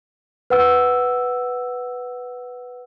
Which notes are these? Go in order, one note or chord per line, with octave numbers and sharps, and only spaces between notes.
B4 F#5 E6